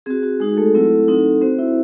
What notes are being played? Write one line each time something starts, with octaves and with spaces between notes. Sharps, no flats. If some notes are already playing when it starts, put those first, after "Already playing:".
C4 F#4 G#4
F#4
G#3 D#4 F#4 G#4
A3 A4
F#3 A3 C4 E4
F#3 C4 D#4
C4 F#4 C5
E4 E5